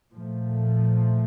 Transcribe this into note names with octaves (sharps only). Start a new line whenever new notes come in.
A#2 F3 A3